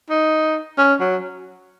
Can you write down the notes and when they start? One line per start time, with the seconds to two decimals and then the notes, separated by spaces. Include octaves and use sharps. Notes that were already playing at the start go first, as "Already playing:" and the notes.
0.10 D#4
0.78 C#4
1.00 F#3